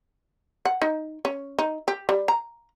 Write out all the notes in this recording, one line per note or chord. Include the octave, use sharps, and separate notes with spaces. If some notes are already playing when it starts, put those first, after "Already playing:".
F#5
D#4
C#4
D#4
G4
G3
A#5